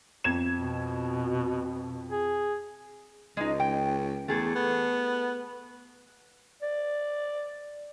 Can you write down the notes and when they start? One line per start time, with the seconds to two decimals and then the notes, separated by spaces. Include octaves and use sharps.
0.24 F2 G#6 E7
0.57 B2
2.11 G#4
3.37 C#2 G#3 D#4
3.60 G5
4.28 E2 A3 G#4 A4
4.55 B3
6.62 D5